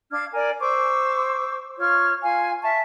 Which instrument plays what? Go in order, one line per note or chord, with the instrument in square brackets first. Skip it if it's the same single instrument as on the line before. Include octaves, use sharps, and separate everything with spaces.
[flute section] D4 F5 F6 G#6
A#4 D5 G#5
C5 C#6 D6 E6
F4 C#5 C#6 F6
F4 F5 G#5
E5 A5 C#6